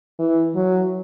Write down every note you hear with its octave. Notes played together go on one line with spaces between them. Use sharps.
E3
F#3